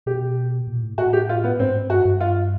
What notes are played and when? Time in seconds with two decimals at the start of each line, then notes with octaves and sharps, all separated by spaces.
0.06 B2 G4
0.67 A#2
0.83 A2
0.98 A2 F#4
1.13 G4
1.29 F4
1.44 B3
1.59 G#2 C4
1.89 G2 F#4
2.05 G2
2.20 F4